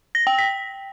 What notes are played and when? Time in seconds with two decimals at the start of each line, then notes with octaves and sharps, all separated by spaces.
0.15 A#6
0.27 G5
0.39 B6